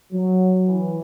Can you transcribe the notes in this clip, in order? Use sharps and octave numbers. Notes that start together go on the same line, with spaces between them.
F#3
E3